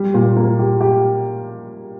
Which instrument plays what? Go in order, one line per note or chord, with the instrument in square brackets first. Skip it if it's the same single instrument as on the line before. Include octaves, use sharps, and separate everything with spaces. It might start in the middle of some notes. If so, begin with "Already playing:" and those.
Already playing: [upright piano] G3
A#2
A#3
G4
G4